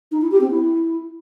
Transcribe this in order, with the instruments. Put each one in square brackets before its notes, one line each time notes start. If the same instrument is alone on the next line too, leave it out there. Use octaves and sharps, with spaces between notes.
[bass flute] D#4
E4
G4
C4
E4